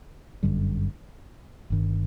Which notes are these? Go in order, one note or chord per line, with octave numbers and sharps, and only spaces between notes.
G1 F#2 D3 G3
G1 G2 D#3